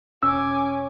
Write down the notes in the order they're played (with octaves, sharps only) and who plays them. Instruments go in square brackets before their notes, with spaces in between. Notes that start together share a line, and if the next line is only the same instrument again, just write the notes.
[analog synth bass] E1 [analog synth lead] C#4 [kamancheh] G#5 D6 [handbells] E6